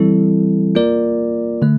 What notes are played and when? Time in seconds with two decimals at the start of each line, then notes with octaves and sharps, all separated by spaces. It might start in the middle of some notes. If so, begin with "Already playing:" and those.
Already playing: E3 G3 C4 E4 A4
0.75 A#3 F4 A#4 D5
1.62 D3 A3